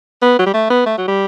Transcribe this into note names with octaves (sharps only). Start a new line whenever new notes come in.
B3
F#3
G3
A3
B3
A3
F#3
G3